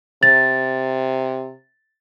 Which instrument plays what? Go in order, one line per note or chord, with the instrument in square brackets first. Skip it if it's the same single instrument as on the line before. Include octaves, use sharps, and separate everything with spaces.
[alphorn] C3 [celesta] A6